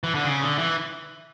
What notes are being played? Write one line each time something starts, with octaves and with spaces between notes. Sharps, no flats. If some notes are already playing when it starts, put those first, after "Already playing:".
E3
D3
C#3
D3
E3